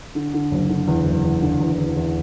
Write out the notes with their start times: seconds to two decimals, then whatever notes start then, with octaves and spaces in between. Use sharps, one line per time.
0.15 D3
0.34 D3
0.51 F#1
0.69 D3
0.87 E2
1.05 F#1
1.24 E2
1.42 D3
1.60 E2
1.78 E2
1.96 E2